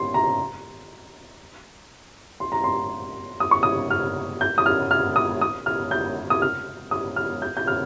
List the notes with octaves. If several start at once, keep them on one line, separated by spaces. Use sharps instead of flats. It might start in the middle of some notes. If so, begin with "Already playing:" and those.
Already playing: C6
A#5
C6
A#5
C6
D#6
C#6
D#6
F6
G6
D#6
F6
F6
D#6
D#6
F6
G6
D#6
F6
D#6
F6
G6
G6
F6